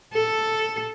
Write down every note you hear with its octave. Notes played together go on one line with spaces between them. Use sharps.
A4